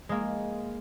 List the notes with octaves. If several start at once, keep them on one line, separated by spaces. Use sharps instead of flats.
G#3 A#3